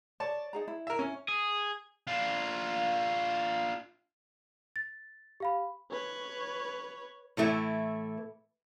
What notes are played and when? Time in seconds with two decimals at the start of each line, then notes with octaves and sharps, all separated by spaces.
0.20 C#5 D5 A5
0.53 D#4 G#4 A#5
0.68 E4
0.87 A#4 E5
0.99 C#4
1.28 G#4
2.07 D4 F4
4.76 A6
5.40 G4 F5 B5
5.92 B4 C#5
7.37 A2 E3 A3 E4